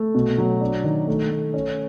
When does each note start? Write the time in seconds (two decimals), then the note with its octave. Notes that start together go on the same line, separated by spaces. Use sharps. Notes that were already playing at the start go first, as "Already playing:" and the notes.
Already playing: A3
0.15 B2
0.38 F#3
0.61 D4
0.84 D#3
1.08 A3
1.31 A3
1.54 C#4